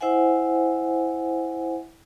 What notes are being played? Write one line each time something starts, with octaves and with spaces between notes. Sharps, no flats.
E4 C5 E5 F#5 G#5